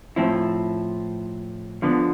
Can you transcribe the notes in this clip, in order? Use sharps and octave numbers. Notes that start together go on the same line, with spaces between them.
A2 F3 C4 E4
D3 F3 B3